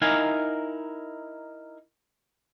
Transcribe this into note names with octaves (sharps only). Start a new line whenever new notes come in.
D#4 E4 A#4 F5 G#5